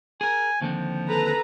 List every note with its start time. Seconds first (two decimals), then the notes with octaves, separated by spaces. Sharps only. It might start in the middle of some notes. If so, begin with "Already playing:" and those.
0.21 G#4 A#4 G#5
0.61 D#2 D3 F3 C4
1.09 A4 B4 A#5